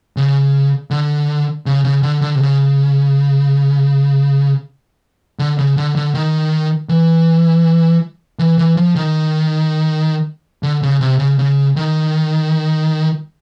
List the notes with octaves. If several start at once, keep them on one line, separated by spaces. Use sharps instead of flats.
C#3
D3
C#3
C#3
D3
D3
C3
C#3
D3
C#3
D3
D3
D#3
E3
E3
E3
F3
D#3
D3
C#3
C3
C#3
C#3
D#3